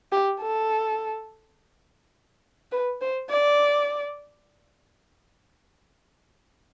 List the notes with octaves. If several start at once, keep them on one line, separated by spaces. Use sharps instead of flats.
G4
A4
B4
C5
D5